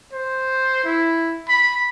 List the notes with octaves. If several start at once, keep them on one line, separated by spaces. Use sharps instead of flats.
C5
E4
B5